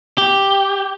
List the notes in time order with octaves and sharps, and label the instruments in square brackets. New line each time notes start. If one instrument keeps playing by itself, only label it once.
[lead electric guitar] G4